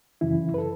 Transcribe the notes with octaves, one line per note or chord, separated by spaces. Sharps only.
F#2 C#3 E3 E4
B4
A4